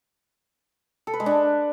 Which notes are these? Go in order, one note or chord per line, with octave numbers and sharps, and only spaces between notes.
A4
B4
G#3
D4